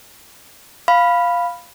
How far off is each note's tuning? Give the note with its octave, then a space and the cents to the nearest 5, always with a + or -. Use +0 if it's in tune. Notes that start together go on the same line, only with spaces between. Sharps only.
F5 +0 B5 +0